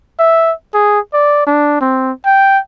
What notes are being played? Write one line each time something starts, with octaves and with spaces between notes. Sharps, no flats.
E5
G#4
D5
D4
C4
G5